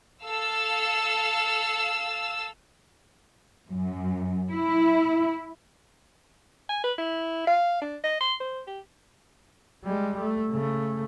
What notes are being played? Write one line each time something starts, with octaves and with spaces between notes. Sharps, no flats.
A4 F5 E6
F#2
E4
G#5
B4
E4
F5
D4
D#5
C6
C5
G4
G3 G#3
A3
C#3 A3